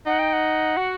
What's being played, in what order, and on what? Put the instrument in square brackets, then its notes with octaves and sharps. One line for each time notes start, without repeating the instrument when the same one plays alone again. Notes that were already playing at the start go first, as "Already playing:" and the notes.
[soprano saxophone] D#4 [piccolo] F#5
[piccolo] G5
F#5
[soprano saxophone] F#4